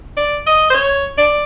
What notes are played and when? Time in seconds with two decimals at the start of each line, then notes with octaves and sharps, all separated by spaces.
0.17 D5
0.47 D#5
0.70 C5
0.74 C#5
1.18 D5